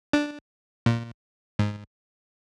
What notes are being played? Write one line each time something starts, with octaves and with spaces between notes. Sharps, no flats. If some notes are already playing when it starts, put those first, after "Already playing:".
D4
A#2
G#2